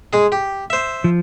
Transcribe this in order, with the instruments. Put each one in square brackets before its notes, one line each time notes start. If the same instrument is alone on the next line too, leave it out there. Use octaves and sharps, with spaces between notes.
[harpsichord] G#3 G#4
G4
C5 E5
[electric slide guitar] F3